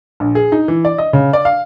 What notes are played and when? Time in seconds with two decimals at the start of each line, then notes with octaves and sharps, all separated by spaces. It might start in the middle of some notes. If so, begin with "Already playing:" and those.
0.20 A#1
0.35 G#4
0.52 D#4
0.68 E3
0.85 D5
0.98 D#5
1.13 C#3
1.33 D5
1.45 F5